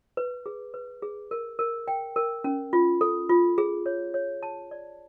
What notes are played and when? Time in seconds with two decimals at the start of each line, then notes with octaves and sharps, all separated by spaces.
0.17 B4
0.46 G#4
0.74 B4
1.02 G#4
1.31 A#4
1.59 A#4
1.88 G5
2.16 A#4
2.44 C#4
2.73 F4
3.01 A4
3.29 F4
3.58 G#4
3.86 C#5
4.14 C#5
4.43 A5
4.71 D5